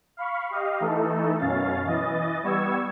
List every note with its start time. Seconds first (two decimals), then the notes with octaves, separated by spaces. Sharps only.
0.17 F5 B5 C#6
0.50 G4 D#5 F5
0.80 E3 A3 D#4 A4
1.38 F#2 B2 C#4 F5 A6
1.86 E3 D#5 A6
2.43 G3 B3 C#6 E6 G#6